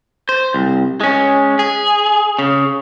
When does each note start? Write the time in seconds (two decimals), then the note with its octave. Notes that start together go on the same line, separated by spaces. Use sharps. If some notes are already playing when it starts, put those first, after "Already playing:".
0.29 C5
0.54 C2
1.01 G#3 C#4
1.59 G#4
2.39 C#3